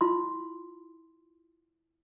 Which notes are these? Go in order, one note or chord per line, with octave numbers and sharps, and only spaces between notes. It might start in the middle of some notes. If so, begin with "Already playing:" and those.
E4 F4 C6